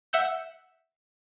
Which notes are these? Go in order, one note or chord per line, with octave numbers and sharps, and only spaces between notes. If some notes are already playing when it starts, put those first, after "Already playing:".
E5 F#5 E6 G6